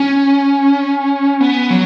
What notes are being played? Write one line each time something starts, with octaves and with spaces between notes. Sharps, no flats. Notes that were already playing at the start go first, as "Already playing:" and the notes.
Already playing: C#4
B3
F#3